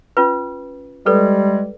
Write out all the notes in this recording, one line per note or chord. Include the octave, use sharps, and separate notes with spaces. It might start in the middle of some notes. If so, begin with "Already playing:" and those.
C#4 F4 B4
G3 G#3 A4 B4 D5